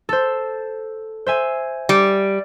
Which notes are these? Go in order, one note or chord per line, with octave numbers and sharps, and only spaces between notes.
A4 C5
C5 E5 G#5
G3